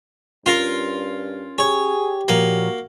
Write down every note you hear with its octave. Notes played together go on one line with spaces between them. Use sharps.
G2 C#4 F4 A#4
G4 G#4 C#5
A#2 F3 A#3 F#4 C#5